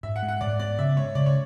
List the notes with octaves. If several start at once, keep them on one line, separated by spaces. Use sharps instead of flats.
G#2 E5
F#5
G#3
F#5
G#2 D5
B3 D5
C#3 E5
G#3 C#5
C#3 D5
C#5